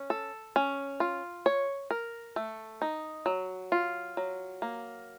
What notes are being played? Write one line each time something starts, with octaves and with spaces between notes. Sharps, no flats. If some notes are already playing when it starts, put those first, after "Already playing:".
Already playing: C#4
A4
C#4
F4
C#5
A#4
A3
D#4
F#3
F4
F#3
A#3